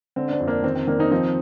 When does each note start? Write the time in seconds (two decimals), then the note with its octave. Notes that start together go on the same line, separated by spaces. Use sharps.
0.16 D3 C4
0.28 D4
0.33 C4
0.40 F2
0.47 A#3 D4
0.63 D#3 C4
0.75 C4
0.87 D#3 A#3 D4
0.99 C4 D#4
1.11 F3 C4 D#4